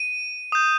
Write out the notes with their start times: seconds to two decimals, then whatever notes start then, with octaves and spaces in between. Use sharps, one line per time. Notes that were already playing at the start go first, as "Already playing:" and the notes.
Already playing: D#7
0.52 D#6 G6